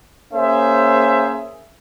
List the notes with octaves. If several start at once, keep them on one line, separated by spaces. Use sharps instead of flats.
A#3 C#4 G#4 C5 E5